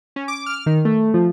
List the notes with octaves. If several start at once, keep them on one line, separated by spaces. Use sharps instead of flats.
C#4
D6
F6
D#3
A3
F3